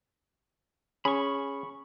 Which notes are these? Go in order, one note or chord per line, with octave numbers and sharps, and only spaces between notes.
C#4 G#4 B5 C#6